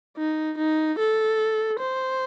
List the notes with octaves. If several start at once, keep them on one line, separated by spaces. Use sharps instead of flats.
D#4
D#4
A4
C5